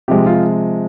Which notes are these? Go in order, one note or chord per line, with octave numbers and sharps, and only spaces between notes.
C3 F3 G#3 G4
F4